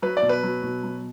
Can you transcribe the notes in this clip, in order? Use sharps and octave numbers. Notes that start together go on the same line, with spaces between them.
F#3 B4
D5
B2
B4
F#3
B2
F#3